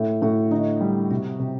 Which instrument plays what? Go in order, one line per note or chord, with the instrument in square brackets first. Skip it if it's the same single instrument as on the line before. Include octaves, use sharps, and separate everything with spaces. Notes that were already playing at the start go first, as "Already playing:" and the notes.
Already playing: [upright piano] A2
[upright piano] A2 [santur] F#4
[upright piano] D3 [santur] D#4
[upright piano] G3
[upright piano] C3 [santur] F#4
[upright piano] C3 [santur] G4